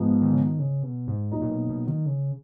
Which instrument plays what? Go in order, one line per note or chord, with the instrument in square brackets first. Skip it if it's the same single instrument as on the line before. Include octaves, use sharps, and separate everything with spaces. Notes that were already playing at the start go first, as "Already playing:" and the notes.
Already playing: [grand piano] G#2 F3 B3
[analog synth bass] D#3
C#3
D#3
C#3
B2
G#2
[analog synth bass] A#2 [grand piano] F#3 A#3 D#4
[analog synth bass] A#2
B2
B2
D#3
C#3